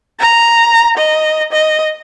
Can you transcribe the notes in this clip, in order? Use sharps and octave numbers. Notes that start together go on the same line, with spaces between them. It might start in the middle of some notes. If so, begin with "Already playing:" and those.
A#5
D#5
D#5